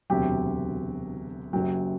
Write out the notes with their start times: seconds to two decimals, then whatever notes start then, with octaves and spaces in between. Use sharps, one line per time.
0.10 E1 D2 C3 F#3 G4 G5
1.53 F#1 F#2 F#3 G4 G5